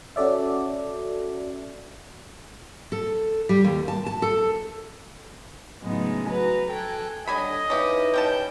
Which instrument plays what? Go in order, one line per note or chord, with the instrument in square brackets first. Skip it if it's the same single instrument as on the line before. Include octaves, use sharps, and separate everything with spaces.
[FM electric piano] C#4 F#4 A4 D5 E5
[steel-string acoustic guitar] A4
G3
D#2
A5
A5
A4
[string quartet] A2 C#3 F#3 G#3 B3 D#4
F#4 B4 A#5
A4 G5 G#5 F#6
[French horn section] D3 G3 D4 [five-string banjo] F#3 G#5 B5 [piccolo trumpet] D#5
[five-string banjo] C#4 G4 F5 [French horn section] D#4 B4 [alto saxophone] E4
[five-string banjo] G3 C#4 A5 [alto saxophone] G5 [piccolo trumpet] G6